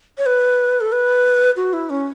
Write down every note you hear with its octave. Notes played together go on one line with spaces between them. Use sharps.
C#5
B4
A4
B4
F#4
E4
C#4